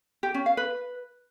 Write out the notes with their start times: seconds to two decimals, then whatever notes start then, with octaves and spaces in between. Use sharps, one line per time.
0.23 G4
0.34 C#4
0.46 F5
0.57 B4